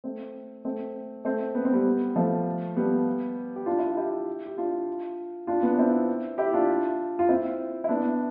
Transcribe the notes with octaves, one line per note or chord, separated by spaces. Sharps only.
A3 C4
A3 C4
A3 C4
B3
C4
G3 B3
F3 A3
G3 B3
G4
D4 F4
E4
F4
E4 G4
G4
D4 F4
D4 F4
B3 D4
D4
C4 E4
E4 G4
D4 F4
F4
C4 E4
E4
B3 D4